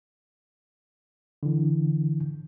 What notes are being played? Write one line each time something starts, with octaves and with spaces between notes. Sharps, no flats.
D3 E3